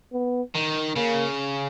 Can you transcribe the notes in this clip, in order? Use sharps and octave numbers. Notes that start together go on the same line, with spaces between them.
B3
D#3
C#3 A#3